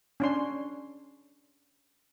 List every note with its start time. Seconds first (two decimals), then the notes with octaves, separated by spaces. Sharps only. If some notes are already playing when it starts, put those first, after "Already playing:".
0.20 C#4 D4 C6